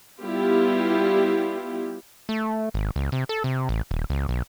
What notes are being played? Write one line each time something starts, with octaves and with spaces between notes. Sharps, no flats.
G3 B3 E4 F4 G4
A3
G#1
C#2
C3
A4
C3
A1
D#1
C#2
B1